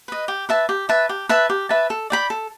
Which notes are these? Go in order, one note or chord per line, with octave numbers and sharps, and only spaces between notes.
B4 D#5
G4
B4 E5 A5
G4
B4 E5 A5
G4
B4 E5 A5
G4
B4 E5 A5
A4
D5 G5 B5
A4